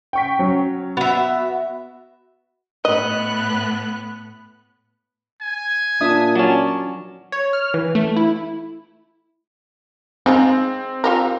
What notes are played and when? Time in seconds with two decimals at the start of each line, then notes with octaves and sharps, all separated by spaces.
0.13 G5 C#6 B6
0.39 F#3 C#4
0.97 B3 F#4 E5
2.85 A2 B3 D#5 F#6
5.42 G#5
6.01 A#2 D4 E5 D#6
6.36 F#3 C#4 D5 A5
7.32 C#5
7.53 F6
7.74 E3
7.95 A3
8.17 E4
10.26 G#3 C4 D#4 F4
11.04 F4 G4 A#4